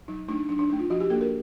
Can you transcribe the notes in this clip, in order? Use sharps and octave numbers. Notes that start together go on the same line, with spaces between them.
F#3 D#4
A3 D4 D#4
F#3 D4
D4
A3 D4 D#4
F4
F3 F#4
G4
A#3 D4 A4
A#4